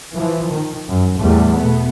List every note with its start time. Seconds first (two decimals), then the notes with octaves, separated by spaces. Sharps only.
0.14 E3 F3
0.52 D#3
0.88 F#2
1.18 E2 A2 G3 A3
1.54 B2 A3 B3